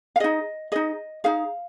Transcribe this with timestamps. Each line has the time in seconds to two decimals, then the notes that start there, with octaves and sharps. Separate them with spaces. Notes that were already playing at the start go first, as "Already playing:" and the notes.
0.16 F5
0.20 D#4 G#4 D#5
0.72 D#4 G#4 D#5
1.24 D#4 G#4 F5